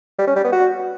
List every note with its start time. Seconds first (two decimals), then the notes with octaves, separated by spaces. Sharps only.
0.19 G3
0.27 C#4
0.36 G3
0.44 B3
0.53 F#4